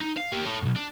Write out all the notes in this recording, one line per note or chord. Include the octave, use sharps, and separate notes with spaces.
D#4
F5
A#3 G4
A4 C#5
B1 G#2
D4